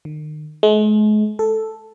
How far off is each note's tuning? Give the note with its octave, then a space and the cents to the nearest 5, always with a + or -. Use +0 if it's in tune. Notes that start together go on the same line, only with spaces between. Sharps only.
D#3 -35
G#3 +40
A4 +0